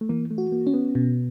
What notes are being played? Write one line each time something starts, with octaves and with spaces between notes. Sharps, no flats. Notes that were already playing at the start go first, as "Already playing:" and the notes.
A3
E3 A#3
A3
F#4
A#3
C#4
B3
B2